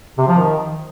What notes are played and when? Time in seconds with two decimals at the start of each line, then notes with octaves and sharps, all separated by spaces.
0.18 C3
0.28 F3
0.38 D#3